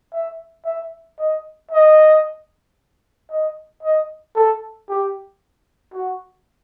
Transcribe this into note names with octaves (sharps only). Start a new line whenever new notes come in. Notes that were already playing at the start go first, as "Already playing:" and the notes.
E5
E5
D#5
D#5
D#5
D#5
A4
G4
F#4